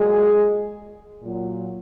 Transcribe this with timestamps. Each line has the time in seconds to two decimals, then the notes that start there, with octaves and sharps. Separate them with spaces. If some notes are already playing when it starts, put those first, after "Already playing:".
Already playing: A#2 F#3 G#3 G#4
1.22 A#2 F#3